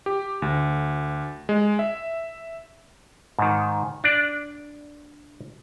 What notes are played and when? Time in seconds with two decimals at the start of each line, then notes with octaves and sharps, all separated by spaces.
0.06 G4
0.42 D2
1.49 G#3
1.79 E5
3.39 G#2 D#3
4.04 D4 D5